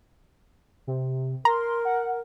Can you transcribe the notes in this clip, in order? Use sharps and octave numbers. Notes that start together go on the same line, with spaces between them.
C3
A#4 A#5 C6
F#5